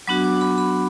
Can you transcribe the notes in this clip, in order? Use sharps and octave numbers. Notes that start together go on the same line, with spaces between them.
F#3 B3 D4 F#4 D6
D6
B5
B5